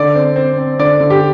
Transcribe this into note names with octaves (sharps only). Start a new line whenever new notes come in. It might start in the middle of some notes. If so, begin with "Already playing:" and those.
Already playing: D3 D5
C4
C4
C4
D3 D5
D3
G4